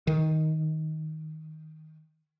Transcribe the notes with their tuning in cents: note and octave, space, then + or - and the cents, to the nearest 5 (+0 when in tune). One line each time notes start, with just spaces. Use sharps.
D#3 +10